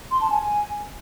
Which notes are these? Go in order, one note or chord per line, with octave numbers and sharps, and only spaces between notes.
C6
A5
G#5